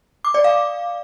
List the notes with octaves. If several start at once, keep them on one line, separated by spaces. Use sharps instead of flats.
D6
D5
F5